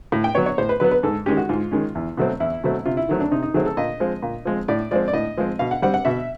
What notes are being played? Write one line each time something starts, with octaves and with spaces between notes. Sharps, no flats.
A2
G5
F#3 B3 C#5
C#5
A2 C5
B4
F#3 B3 B4
B4
G#2 A4
D#3 G#3 C#4 G4
F#4
G#2 F4
D#3 G#3 C#4
E2
B2 F#3 A3 C4
E2 E4
B2 F#3 A3 C4
C3 F4
E4
D#3 F#3 A3 C4
D4
C3 D#4
D#4
D#3 F#3 A3 C4 G#4
A4
A#2 D#5
F3 G#3 C4
A#2
F3 G#3 C4
A2 D5
F3 G#3 C4 D5
D5
A2 D#5
F3 G#3 C4
B2 F5
F#5
G3 C4 F#5
F#5
B2 E5